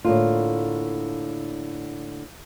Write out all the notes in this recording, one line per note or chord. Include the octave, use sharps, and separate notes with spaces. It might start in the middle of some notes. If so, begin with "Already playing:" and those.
A2 D3 A#3 F4